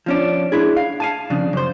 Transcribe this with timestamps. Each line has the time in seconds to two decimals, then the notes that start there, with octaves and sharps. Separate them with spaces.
0.06 F3 C#4 D4
0.52 D4 E4 G#4
0.77 F5
1.00 F5 G#5 A5
1.30 F2 C#3 D4
1.53 F#2 C5